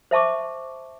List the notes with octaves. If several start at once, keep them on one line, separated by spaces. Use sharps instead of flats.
C5 E5 A5 C#6 D6